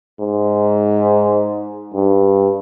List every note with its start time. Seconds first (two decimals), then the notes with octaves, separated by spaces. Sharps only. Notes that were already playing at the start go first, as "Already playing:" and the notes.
0.19 G#2
1.94 G2